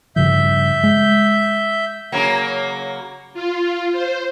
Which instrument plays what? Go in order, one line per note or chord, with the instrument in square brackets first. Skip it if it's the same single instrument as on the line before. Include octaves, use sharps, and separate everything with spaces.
[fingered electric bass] G2 C#3 F3 [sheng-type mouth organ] E5 G6
[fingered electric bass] G#3
[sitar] C#3 F#3 A#3
[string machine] F4
C5